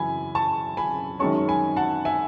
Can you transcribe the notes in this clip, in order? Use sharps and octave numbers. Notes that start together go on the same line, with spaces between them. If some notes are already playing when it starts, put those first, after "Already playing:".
Already playing: F#2 C#3 E3 G#5 B5
A5 C#6
G#5 B5
F#2 D#3 G#3 C#4 A5 C#6
G#5 B5
F#5 A5
E5 G#5